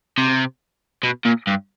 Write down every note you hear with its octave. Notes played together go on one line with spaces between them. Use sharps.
C3
B2
A#2
G2